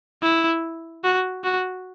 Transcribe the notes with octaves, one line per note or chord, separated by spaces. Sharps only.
E4
F#4
F#4